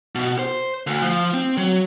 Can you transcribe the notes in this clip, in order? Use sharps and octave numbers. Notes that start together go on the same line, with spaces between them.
B2
C5
D2
F3
C4
F#3